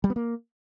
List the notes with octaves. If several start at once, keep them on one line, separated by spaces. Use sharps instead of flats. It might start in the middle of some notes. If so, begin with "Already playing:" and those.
G3
B3
A#3